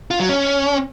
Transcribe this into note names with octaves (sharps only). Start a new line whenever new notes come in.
F4
F#3
C#4